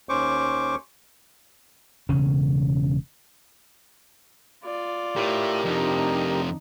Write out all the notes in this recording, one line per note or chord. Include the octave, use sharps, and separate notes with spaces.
D#2 C#4 C5 C#6 D6
E1 C#3 C#4
F4 D5
A2 G4 A#4
F2 C3 D4 D#4